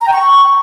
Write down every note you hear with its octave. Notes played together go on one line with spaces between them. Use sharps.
A#5
G5
C#6